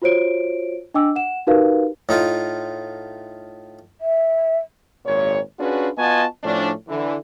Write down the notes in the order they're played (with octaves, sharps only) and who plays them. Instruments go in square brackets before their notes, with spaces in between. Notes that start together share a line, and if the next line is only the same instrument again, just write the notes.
[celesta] F4 F#4 C5 C#5 D7
D4 D#5 G5 D6 E6
F#5 E7
D#4 F#4 G4 A#4 B4 F5
[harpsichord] A2 D#4 F4
[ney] E5
[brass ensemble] G#1 A#2 C#5
C#4 D4 F4 F#4 G#4 B4
B3 F4 F#4 D#5 G#5 A5
A2 F3 C#4 D4
D3 E3